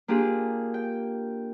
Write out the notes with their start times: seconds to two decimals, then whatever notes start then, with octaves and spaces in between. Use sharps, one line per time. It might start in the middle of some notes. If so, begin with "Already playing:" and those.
0.08 A#3 D4 F4 G4 G#4
0.74 G5